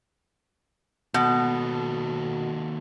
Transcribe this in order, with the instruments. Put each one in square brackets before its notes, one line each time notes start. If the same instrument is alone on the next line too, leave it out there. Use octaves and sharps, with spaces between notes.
[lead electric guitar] D#2 A4 [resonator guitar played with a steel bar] B2